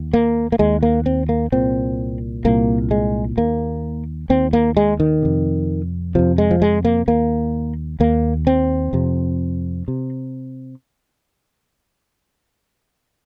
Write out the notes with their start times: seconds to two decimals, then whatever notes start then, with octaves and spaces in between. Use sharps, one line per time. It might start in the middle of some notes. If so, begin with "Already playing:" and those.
Already playing: D#2
0.13 A#3
0.52 A#3
0.59 D#2 G#3
0.83 A#3
1.06 C4
1.29 A#3
1.52 C2 A#2 C4
2.45 C2 A#2 A#3
2.91 G#3
3.37 D#2 A#3
4.30 D#2 C4
4.53 A#3
4.77 G#3
5.00 D#3
5.22 F2 C3
6.15 F2 C3 F3
6.38 G#3
6.51 F3
6.62 G#3
6.85 A#3
7.07 D#2 A#3
8.00 D#2 A#3
8.47 C4
8.93 F2 C3
9.88 C3